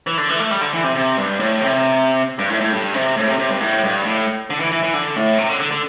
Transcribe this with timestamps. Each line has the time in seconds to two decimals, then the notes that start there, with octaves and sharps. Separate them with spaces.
0.07 E3
0.18 D3
0.29 E3
0.40 A3
0.51 G3
0.61 D3
0.73 E3
0.84 C3
0.95 C3
1.18 G2
1.40 A2
1.61 C3
2.39 G2
2.50 A2
2.61 A2
2.72 G2
2.94 C3
3.17 A2
3.28 C3
3.39 C3
3.50 G2
3.60 A2
3.84 G2
4.05 A2
4.50 D3
4.60 E3
4.72 E3
4.83 E3
4.93 D3
5.16 A2
5.38 C3
5.49 D3
5.60 D3
5.71 D3